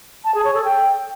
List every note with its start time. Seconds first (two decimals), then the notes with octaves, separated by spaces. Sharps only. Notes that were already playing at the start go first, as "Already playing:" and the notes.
0.25 A5
0.35 G#4
0.45 C#5
0.55 A4
0.65 G5